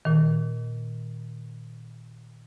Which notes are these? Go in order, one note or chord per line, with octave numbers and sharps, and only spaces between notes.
A#2 D#3